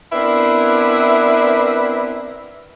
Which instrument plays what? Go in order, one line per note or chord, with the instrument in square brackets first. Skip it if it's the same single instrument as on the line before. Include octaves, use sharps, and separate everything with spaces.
[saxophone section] B3 C4 D4 E4 A#4 B4